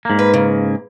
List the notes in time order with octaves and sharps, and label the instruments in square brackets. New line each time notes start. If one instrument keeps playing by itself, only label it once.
[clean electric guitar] G#2 A#3
[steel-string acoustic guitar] B4
C#3